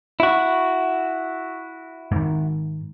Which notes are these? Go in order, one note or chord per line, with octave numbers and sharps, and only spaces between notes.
E4 F#4
G#2 D#3